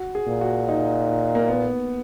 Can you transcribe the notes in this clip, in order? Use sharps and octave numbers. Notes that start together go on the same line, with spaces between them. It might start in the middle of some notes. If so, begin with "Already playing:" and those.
Already playing: F#4
G#4
A#2
F#4
D#4
A#3
B3